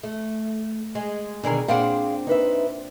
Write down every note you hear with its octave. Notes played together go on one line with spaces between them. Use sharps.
A3
G#3
B2 D3 D#3 G#4 A#4
A#2 C4 D4 G#4 F5 F#5
D#4 B4 E5